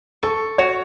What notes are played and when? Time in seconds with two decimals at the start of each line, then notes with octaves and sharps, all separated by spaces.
0.23 A4 C#6
0.58 F#4 C#5